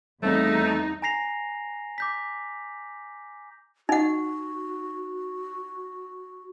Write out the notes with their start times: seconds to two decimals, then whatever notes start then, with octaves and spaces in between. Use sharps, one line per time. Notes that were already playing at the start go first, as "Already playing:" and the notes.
0.23 E2 G3 A3 C4 D#4
1.02 G#5 A#5 A#6 C7 F7
1.98 D6 G6 B6
3.89 D#4 F#4 F#5